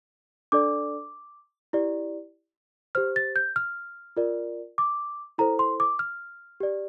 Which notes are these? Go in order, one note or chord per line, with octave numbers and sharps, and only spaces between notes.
D4 A4 D5 D6
E4 G4 D5
G4 C5 F6
A6
G6
F6
F4 A#4 D5
D6
E4 A4 C5 A#5
C6
D6
F6
G4 D5